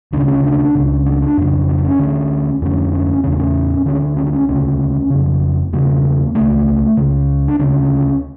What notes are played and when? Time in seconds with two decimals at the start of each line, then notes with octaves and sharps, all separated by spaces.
0.13 D2 C#3 D4
0.28 C#4
0.44 D4
0.75 C#2 C#3
1.06 D4
1.22 D4
1.37 F2 C#3
1.68 D4
1.78 D4
1.84 C#4
1.99 D2 D3
2.62 F2 D3 C#4
2.93 C#4
3.23 E2 C#3 C#4
3.32 D4
3.40 C#4
3.86 D2 D3 C#4
4.02 D4
4.17 C#4
4.27 D4
4.33 C#4
4.49 D2 C#3 C#4
5.10 F2 C#3
5.73 E2 C#3 A#3
6.35 C#2 C#3 A3
6.97 C#2 C#3
7.48 D4
7.59 D2 C#3 C#4